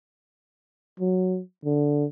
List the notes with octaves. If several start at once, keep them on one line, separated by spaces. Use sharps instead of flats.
F#3
D3